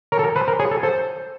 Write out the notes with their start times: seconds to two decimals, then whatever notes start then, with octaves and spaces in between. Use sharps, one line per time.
0.12 A#4 C#5
0.19 A4
0.24 A#4
0.35 B4 C5
0.48 A#4
0.59 G#4 C#5
0.71 A4
0.83 A4 C5